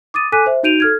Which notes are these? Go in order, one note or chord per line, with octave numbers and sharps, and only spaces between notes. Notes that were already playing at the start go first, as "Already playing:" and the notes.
D6 D#6 A6 D#7
A4 G#5 D6 F#6 B6 D#7
C5 E5
D#4 F#4 G6 D7 D#7 F7
A4 F6 G#6